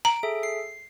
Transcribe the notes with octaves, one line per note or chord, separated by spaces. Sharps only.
A#5 D7
G#4 A4 E5
C7